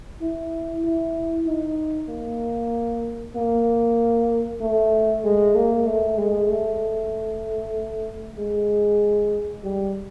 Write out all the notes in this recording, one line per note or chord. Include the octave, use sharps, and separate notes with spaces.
E4
E4
D#4
A#3
A#3
A3
G#3
A#3
A3
G#3
A3
G#3
G3